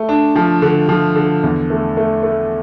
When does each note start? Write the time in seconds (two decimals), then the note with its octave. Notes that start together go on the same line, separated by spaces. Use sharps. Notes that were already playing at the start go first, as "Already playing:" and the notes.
Already playing: A3
0.09 D4
0.36 F3
0.62 D3
0.89 F3
1.16 D3
1.43 E2
1.70 A3
1.97 A3
2.23 A3